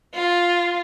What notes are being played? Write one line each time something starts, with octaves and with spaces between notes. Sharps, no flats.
F4